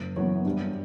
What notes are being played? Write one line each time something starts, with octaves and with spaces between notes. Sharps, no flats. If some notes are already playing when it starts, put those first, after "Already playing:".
Already playing: F#1
F#2 E3 B3 C#5
G2